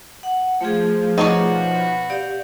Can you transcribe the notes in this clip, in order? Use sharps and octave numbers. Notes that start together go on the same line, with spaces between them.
F#5
F3 A3 G#4
B2 D#4 F#4 C#5 D5
B5
G4 D5 F5